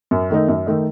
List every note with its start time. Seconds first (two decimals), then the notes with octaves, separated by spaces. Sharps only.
0.11 F#2
0.30 D#3 A3 D#4
0.48 F#2
0.66 D#3 A3 D#4